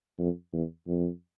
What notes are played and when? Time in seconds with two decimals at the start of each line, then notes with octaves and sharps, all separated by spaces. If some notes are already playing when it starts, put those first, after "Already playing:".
0.19 F2
0.53 E2
0.87 F2